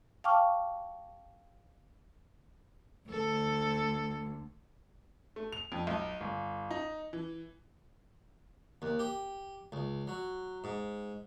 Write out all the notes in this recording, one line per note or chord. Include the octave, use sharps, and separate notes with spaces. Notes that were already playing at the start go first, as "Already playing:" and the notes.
F5 G5 A5 C#6 D6 F6
D2 A4
A3
F7
F2
B1
G1
D#4
E3
D#2
G4
C#2
F#3
G#2